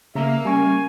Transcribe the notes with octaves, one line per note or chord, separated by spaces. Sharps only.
C#3 A#3 E5 A#5
G3 C#4 G#5 C#6